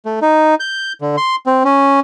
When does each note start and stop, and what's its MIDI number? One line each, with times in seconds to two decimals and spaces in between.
0.05 0.19 57
0.22 0.55 63
0.60 0.93 91
1.01 1.16 50
1.17 1.36 84
1.46 1.63 60
1.65 2.00 61